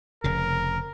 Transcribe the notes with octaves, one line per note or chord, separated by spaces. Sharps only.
F1 C#3 A#4